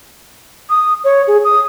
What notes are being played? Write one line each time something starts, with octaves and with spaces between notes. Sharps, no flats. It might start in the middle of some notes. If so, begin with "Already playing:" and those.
D#6
C#5
G#4
D#6